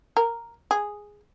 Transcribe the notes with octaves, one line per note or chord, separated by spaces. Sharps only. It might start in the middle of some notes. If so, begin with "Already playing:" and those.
A#4
G#4